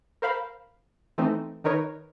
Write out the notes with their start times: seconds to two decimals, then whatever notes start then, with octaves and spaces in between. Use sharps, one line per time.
0.22 A#4 C5 F5 B5
1.18 E3 A3 C4 D#4
1.64 D#3 D#4 A#4 B4 C#5